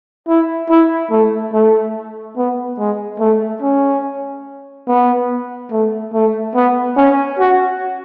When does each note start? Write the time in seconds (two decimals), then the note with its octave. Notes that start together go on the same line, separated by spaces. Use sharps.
0.28 E4
0.70 E4
1.11 A3
1.53 A3
2.36 B3
2.79 G#3
3.20 A3
3.62 C#4
4.87 B3
5.71 A3
6.14 A3
6.55 B3
6.97 C#4
7.39 F#4